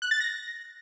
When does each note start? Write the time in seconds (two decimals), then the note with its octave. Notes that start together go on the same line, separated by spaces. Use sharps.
0.02 F#6
0.11 A6
0.20 A#6